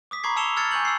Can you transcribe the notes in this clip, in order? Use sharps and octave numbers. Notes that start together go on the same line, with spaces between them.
D6 D#6 B6
A#5 B5 C#6 D6 G#6 C7
A5 E6 C#7 E7 F7 G7
E6 F6 G#6 A6 C#7
G#5 C#6 G6 F#7
E6 C7